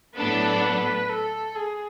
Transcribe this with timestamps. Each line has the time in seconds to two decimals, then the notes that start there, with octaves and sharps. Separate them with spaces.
0.16 A2 F#3 B3 D4 A4 B4
1.09 A4
1.56 G#4